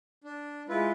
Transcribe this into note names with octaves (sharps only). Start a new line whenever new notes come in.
D4
G#3 E4 F4 B4